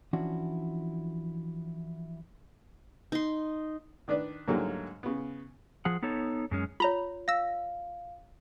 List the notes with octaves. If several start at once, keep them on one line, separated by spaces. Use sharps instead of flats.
E3 F3 C#4 D4 E4 F#4
D#4 C6
D#3 D4 B4 D5
G#2 D3 F#3 G3 A3 A#3
C#3 B3
F3 G#4 F#5
B3 D#4 A4 C#5
F#2 G#3 C#4
F4 C#5 A#5 B5
F5 E6 A#6